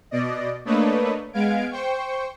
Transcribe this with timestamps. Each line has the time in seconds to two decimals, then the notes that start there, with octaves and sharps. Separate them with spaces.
0.11 B2 D5 D#5
0.65 A3 A#3 D4 B4 C#5 D#5
1.33 G#3 B3 F5 G#6 D7
1.71 C5 G5 C#6